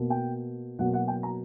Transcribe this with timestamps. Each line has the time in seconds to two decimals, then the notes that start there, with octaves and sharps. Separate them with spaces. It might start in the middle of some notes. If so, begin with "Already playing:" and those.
Already playing: B2 A#3
0.10 G5
0.79 B2 F#3 A#3 F#5
0.94 F#5
1.08 G5
1.23 A#5